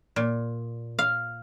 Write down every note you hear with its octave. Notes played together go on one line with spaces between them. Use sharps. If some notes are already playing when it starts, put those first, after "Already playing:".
A#2
F5